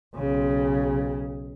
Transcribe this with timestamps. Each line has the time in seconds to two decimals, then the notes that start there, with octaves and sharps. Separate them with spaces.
0.15 B1 C#3